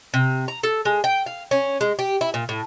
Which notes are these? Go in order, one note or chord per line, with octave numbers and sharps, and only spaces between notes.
C3
A#5
A4
G#3
G5
F5
C#4
G#3
G4
E4
A#2
A2